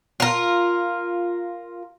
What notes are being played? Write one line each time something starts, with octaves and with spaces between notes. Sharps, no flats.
F4 A#4